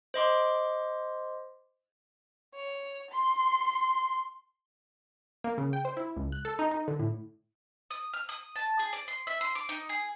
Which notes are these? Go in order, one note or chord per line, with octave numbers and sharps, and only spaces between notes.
C5 D#5 C6 D6
C#5
C6
A#3
C#3
G5
C5
E4
C#2
F#6
A4
D#4
D#4
D3
A2
D#6
F6
D#6
A5
G#4
D5
C6
E5
C6
D6
D#4
G#4